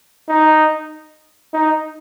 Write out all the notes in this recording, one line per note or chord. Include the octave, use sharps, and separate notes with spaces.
D#4
D#4